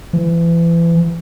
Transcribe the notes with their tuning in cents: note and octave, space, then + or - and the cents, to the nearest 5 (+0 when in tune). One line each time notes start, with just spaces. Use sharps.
E3 +35